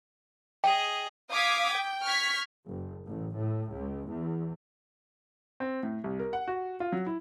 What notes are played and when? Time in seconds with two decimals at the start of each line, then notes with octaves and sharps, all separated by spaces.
0.64 G#4 D#5 G5
1.31 F5 D6 D#6 G#6 B6
1.72 G5
2.03 C#6 F6 G#6 B6
2.67 F#1
3.06 A1
3.38 A2
3.73 C#2
4.11 E2
5.60 C4
5.83 A2
6.04 C2
6.19 A#4
6.33 F#5
6.48 F#4
6.80 F4
6.92 F#3
7.07 E4